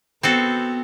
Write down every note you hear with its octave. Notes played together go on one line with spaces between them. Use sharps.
B3 C4 F#4 A4